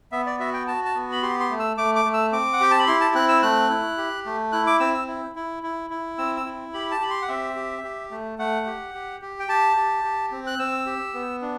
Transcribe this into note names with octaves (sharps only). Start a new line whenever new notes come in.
B3 E5
D5
F#4 E5
G5
F#4 A5
A5
B3
B5
G4 C6
C6
A3
E6
A3 D6
D6
A3
E6
C4 D6
F#5
G4 G5
A5
B5
E4 C6
A5
C4 F#6
E6
A3 F#6
E4
G4
A3
E4 F#6
D6
C4 E6
E6
E4
E4
E4
E4
C4 E6
E6
E4
G4 B5
A5
G4 B5
C6
F#5
C4 E5
G4
G4
A3
A3 F#5
G4
G4
G4
G5
G4 A5
G4
G4
C4
F#6
C4 E6
G4
B3
D4